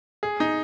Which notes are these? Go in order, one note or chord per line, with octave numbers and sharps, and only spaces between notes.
G#4
D#4